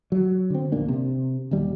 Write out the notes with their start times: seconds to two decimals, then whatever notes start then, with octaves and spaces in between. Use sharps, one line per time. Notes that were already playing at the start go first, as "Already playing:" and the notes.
0.12 F#3
0.50 D3 C4
0.72 A#1 D#2 A#3 D4
0.88 C3
1.51 D#1 D#2 G3